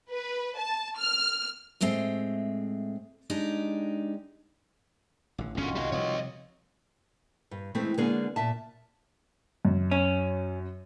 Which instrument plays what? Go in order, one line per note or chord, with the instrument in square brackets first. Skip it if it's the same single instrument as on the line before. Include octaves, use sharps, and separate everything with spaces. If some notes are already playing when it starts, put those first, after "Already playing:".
[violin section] B4
A5
F6
[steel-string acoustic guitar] A2 G#3 A3 C4
G#3 D4 D#4 G4
[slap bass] A1 D3
[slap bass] G1 E2 B2 [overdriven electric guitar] D3 C#4 [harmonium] D#3 F4 F#4
[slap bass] C2 [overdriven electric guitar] G3 D#5
[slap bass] C3 F3 G3 [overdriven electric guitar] C#5 D#5
[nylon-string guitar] G2
E3 G#3 A3 C4
D3 G#3 A#3 B3 C#4 G#4
A#2 E5 A5
[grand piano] F#2
[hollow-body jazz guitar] C#4